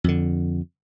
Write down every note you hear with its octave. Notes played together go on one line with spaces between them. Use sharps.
F2 D3